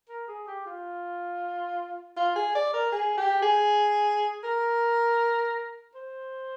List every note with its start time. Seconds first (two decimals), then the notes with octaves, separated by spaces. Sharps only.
0.09 A#4
0.28 G#4
0.47 G4
0.66 F4
2.17 F4
2.36 G#4
2.55 D5
2.73 A#4
2.92 G#4
3.17 G4
3.42 G#4
4.44 A#4
5.95 C5